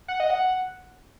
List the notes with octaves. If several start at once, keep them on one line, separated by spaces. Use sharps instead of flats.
F#5
D#5
F#5